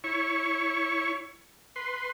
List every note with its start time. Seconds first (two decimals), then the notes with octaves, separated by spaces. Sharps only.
0.04 E4 C#5 C#6
1.76 B4 C6